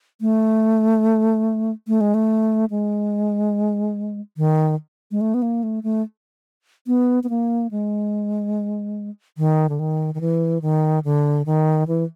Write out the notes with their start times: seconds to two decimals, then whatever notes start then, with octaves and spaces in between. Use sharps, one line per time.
0.21 A3
1.88 A3
2.01 G#3
2.14 A3
2.70 G#3
4.37 D#3
5.11 G#3
5.21 A3
5.34 B3
5.42 A#3
5.63 A3
5.83 A3
6.87 B3
7.24 B3
7.30 A#3
7.71 G#3
9.38 D#3
9.69 D3
9.79 D#3
10.15 D#3
10.21 E3
10.62 D#3
11.05 D3
11.46 D#3
11.88 E3